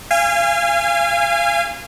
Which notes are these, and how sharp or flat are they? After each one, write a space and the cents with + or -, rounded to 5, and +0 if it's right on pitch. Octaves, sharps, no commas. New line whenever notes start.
F5 -30 G#5 -25